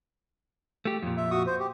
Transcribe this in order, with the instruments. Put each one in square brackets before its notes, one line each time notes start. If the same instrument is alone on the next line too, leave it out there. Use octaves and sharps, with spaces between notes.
[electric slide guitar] A3 G4
F2 A#2
[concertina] E5
F#4 C#6 D#6
C5
G4